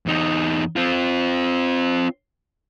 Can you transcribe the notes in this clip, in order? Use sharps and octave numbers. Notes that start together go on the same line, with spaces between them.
E2 D#4
C4 F4